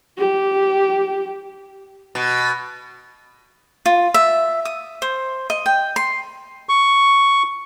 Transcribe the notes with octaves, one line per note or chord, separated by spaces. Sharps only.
G4
B2
F4
E5
D#6
C5
D#5
G5
C6
C#6